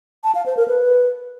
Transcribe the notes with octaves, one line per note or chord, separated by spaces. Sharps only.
A5
F5
C5
A#4
B4